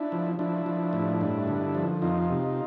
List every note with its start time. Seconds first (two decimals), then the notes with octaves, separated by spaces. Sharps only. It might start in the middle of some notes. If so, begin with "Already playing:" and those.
Already playing: D4 E4
0.12 F3
0.39 F3 D4 E4
0.66 F3
0.93 A2
1.21 G2
1.47 D3
1.75 F3
2.02 F2 D#4 F4
2.29 C3